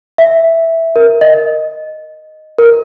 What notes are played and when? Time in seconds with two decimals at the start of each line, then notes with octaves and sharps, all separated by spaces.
0.18 E5
0.96 A#4
1.21 D#5
2.58 A#4